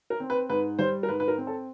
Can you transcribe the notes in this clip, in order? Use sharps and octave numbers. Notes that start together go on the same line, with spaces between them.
A#4
C4
B4
G#2 B4
G3 C5
A#4
G#2 B4
B4
A#4
C4
A4